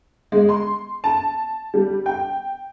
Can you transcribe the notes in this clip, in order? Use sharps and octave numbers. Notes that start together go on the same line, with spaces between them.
G#3
C6
A5
G3
G5